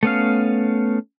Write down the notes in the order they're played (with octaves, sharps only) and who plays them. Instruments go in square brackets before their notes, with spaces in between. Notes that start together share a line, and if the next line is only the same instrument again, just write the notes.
[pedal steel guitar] A3 B3 C#4 F5